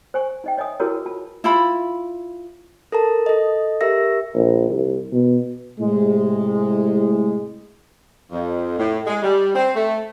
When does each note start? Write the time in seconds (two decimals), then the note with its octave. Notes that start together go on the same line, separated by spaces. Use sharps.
0.14 C5 G#5 C#6
0.44 D#4 D#5 G5
0.57 C#5 D#5 E5 G#5 D#6
0.80 E4 F#4 G#4 A#4 B4 C#5
1.06 F4 A5
1.44 E4 F4 B5
2.92 A4 A#4 A5
3.26 A4 D#5
3.81 G4 A#4 E5 E6 A#6
4.34 A#1
4.70 C2
5.13 B2
5.79 A2 C3 G#3
8.32 F2
8.78 A2
9.07 G#3
9.23 G3
9.55 C4
9.75 A3